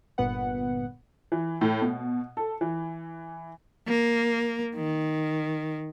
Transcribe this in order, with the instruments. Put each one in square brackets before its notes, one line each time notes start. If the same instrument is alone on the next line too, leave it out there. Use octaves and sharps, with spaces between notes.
[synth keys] G1 A#2 B3 B4 F#5
[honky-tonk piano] E3
A2
B2
A4
E3
[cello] A#3
D#3